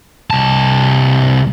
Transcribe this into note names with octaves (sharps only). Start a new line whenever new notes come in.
C2 A5